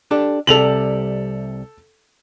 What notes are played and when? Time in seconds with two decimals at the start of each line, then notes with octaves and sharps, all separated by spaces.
0.11 D4 G4 A4
0.47 C2 C3 G3 A4 F7 F#7